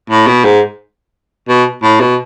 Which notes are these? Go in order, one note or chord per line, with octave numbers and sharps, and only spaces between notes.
A2
B2
G#2
B2
A2
B2